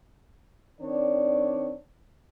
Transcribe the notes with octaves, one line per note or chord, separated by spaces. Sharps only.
D#3 C4 D4 C#5 D5